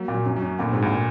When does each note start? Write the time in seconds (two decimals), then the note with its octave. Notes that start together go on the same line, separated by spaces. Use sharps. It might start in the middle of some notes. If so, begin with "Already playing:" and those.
Already playing: F#3 A#3
0.08 A#2
0.14 F#3
0.26 F#2
0.36 F#3
0.42 F#2
0.59 D2 A#2
0.73 G#2
0.82 D2 A#2